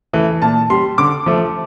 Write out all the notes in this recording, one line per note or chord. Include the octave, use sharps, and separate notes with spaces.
E3 A3
A#2 A5
G3 C6
D3 D6
F3 A3